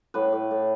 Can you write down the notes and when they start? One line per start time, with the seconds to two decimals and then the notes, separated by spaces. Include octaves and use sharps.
0.14 A2 B4
0.33 A2
0.51 A2